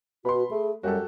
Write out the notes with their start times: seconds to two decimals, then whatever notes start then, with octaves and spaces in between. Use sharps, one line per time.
0.25 B2 F#4 B5 C6
0.51 A3 G#4
0.83 F#2 G3 F#4 G4 A4